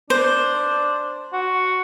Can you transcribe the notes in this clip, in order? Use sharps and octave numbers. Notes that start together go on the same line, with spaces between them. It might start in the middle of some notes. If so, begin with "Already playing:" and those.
D4 C5
F#4